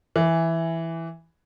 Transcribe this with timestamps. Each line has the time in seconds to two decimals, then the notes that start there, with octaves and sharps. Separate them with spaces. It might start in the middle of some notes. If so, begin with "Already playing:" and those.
0.16 E3